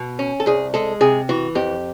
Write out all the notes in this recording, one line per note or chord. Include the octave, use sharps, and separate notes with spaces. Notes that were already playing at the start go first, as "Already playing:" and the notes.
Already playing: B2
C#4
A4
C2 G#4
G#3 A4
C3 G#4
E3 F#4
F2 G4